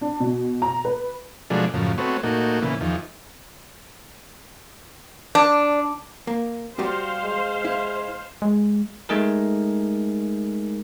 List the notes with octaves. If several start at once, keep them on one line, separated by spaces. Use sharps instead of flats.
D4
B2
A#5
B4
B2 F3 F#3 G#3 A3 D4
F#2 A2 C#3 F3
A3 B3 C4 F#4 C#5
A#2 A3 A#3 D#4 F#4
A#2 C#3 E3 B3
E2 D#3 F3
D4
A#3
G3 F#4 G4 C5 F5
G#3
E4
G#3
G#3 A3 D#4 G#4 A#4